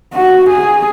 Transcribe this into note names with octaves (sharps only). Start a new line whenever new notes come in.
F#4
G#4